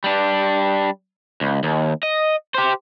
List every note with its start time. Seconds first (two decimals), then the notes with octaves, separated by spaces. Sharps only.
0.04 G3 D4
1.41 C#2
1.63 D#2
2.03 D#5
2.54 G4 C5